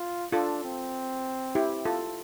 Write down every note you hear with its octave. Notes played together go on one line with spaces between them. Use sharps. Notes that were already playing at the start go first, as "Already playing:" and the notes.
Already playing: F4
D4 F4 A4
C4
E4 G4
F4 A4